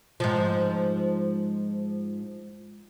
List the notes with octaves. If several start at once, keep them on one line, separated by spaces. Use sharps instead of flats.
G#2 F3